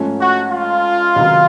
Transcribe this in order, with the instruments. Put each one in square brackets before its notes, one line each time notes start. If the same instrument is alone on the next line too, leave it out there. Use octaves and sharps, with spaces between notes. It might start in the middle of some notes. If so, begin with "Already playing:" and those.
Already playing: [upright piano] G#2 F3 A3 C#4
[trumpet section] F#4
F4
[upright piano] C#2 C3 D#3 F#3